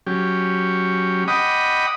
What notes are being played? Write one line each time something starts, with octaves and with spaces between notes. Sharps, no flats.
F#3 C#4 G4
D#5 F#5 G5 B5 D6 D#6